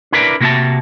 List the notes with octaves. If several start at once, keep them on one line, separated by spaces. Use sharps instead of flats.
D4 E4 A#4 B4 D5
C3 A#3 F#4 A#4 E5 A5